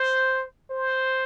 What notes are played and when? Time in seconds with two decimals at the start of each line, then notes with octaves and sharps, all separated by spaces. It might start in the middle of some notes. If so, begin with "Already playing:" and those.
Already playing: C5
0.70 C5